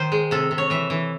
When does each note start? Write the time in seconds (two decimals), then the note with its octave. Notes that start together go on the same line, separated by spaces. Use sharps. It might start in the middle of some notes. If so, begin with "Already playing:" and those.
Already playing: D#3 C5
0.12 G#3
0.31 C3 A4
0.51 C3
0.58 C#5
0.70 E3 E5
0.90 E3